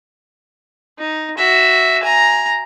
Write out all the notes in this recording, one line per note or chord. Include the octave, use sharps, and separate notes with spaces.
D#4
F#4 E5
G#5 A#5